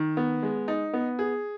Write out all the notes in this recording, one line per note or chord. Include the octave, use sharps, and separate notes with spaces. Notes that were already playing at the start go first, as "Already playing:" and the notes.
Already playing: D#3
B3
G#3
D#4
B3
G#4